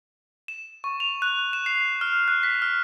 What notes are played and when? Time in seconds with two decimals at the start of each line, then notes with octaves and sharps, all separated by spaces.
0.48 E7
0.84 C#6
1.00 F7
1.22 F#6
1.53 E7
1.66 C7
2.01 F6
2.28 F#6
2.43 B6
2.62 F6